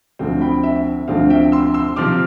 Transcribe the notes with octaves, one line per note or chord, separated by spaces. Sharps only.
D2 D3 F3 C4
G5 B5
E5
D2 D3 F3 C4 F5
E5 G5
C6 E6
C6 E6
C3 F3 C4 D6 F6